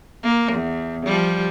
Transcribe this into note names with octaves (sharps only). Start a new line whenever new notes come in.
A#3
E2
F3 G3